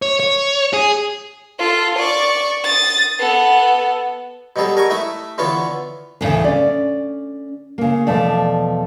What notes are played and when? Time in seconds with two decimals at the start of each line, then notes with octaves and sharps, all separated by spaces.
0.02 C#5
0.20 C#5
0.73 G#4
1.59 F4 A4
1.98 D5 C#6
2.64 D#6 A6
3.19 B3 A4
4.56 B2 F#3 G3 G#4 A4
4.77 A#4 G#5 C#6
4.90 A3 E4 E5 D#6
5.38 D3 E3 B3 F4 C#5
6.21 D2 A2 C#3 E3
6.44 C#4 D5
7.78 C#3 A#3
8.07 E2 B2 F3 A3 D5